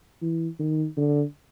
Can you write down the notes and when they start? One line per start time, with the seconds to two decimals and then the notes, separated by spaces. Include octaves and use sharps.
0.22 E3
0.59 D#3
0.97 D3